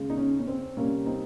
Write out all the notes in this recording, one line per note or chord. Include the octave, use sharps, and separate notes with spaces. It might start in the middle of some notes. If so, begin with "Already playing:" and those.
Already playing: C#3 G#3
D#4
C#4
C#4
C4
C3 G3 A#3 C#4
C4 D#4